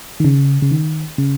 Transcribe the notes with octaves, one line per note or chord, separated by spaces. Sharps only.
D#3
C#3
C#3
D#3
C#3